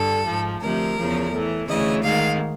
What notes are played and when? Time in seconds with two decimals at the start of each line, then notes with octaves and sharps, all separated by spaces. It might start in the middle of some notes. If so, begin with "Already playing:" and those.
Already playing: G2 D3 A4
0.25 G#2 F3
0.61 D2 C3 F3 A#4
0.96 E2 C#3 F3
1.32 A2 E3
1.68 D2 C#3 E3 D#5
2.03 G#2 D#3 F5